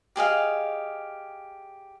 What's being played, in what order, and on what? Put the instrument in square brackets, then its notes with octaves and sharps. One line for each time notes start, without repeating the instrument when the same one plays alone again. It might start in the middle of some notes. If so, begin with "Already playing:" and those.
[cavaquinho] G4 G#4 D#5 F5